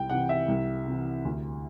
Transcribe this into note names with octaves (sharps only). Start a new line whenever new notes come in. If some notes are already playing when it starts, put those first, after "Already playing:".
Already playing: C2 G5
C3 E3 F#5
E5
C2
C3 E3
D2